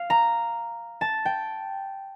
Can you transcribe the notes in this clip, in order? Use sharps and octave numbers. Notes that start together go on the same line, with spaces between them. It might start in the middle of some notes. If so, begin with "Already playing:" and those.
Already playing: F5
A#5
A5
G5